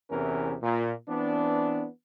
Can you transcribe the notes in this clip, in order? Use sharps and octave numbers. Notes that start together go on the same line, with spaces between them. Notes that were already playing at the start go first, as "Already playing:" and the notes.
E2 C3 E3 C#4 A#4
A#2
E3 B3 C4 D4